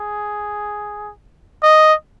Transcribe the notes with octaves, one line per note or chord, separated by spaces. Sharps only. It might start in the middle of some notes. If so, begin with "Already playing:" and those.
Already playing: G#4
D#5